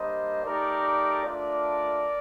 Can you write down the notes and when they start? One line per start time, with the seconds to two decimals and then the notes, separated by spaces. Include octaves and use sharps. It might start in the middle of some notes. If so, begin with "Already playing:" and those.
Already playing: G3 A#3 D4 C5 D#5
0.43 A3 D#4 G4 A#4 D5
1.26 A3 D4 F4 A#4 D5